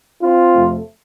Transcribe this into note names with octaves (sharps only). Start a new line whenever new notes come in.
C4 F4
F2 C3 A3